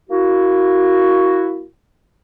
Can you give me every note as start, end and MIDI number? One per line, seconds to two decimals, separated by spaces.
0.10 1.64 58
0.10 1.64 64
0.10 1.64 66